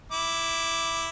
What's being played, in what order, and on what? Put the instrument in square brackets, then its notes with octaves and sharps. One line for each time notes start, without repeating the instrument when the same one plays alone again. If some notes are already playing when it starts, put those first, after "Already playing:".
[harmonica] E4 D6